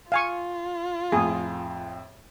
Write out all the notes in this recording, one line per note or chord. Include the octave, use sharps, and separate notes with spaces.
F4 F5 G#5 C#6
F2 A2 G#4